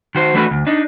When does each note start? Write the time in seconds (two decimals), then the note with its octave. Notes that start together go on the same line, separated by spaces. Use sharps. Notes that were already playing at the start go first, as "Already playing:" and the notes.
0.15 D#3 F#4 C5
0.34 E3 A3 D4 E4 F#4 B4
0.51 D2
0.67 D4 D#4